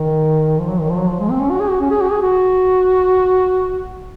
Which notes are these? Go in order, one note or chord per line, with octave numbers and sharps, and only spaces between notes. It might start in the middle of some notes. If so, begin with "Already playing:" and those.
Already playing: D#3
F3
F#3
D#3
F3
F#3
F3
G#3
C4
C#4
F#4
G#4
F#4
C#4
G#4
F#4
G#4
F#4